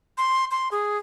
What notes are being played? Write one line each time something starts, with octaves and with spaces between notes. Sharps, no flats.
C6
C6
G#4